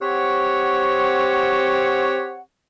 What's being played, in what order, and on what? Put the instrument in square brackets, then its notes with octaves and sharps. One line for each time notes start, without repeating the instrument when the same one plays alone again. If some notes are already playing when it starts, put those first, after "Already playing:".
[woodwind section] C4 G4 C#5 F#5